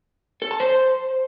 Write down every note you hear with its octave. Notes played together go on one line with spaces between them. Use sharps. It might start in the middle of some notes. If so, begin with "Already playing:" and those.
A4
A5
C5